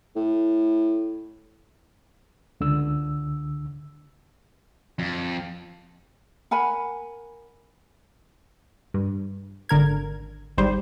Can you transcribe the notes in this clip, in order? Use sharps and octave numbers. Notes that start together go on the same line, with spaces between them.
A2
C#2 D3 E6
F2
A#4 F#5 G#5 B5
G2
G#1 D3 A#4 G#6
G#1 G#2 G3 C5